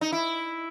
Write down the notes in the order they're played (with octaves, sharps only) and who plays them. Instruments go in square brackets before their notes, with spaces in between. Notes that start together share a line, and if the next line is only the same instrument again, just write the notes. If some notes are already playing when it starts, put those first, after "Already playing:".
[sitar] D#4
E4